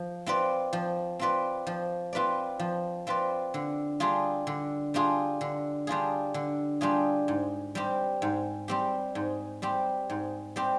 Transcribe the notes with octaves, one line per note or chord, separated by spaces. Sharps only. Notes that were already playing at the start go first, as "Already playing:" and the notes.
Already playing: F3
C4 F4 B4 D5
F3
C4 F4 B4 D5
F3
C4 F4 B4 D5
F3
C4 F4 B4 D5
D3
G3 D4 F4 G#4
D3
G3 D4 F4 G#4
D3
G3 D4 F4 G#4
D3
G3 D4 F4 G#4
G#2
G3 C4 G4
G#2
G3 C4 G4
G#2
G3 C4 G4
G#2
G3 C4 G4